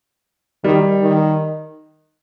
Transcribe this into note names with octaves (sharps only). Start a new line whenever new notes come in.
D#3 G3
D#3